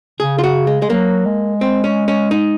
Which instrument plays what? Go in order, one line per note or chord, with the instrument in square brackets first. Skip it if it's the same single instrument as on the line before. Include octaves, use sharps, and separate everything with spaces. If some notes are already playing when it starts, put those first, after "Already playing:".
[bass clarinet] C#3 [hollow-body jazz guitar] G#4
[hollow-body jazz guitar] F4
F#4
G#3
G#3
[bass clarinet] F#3 [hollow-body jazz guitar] A#3
[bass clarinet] G#3
[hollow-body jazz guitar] C4
C#4
C#4
D#4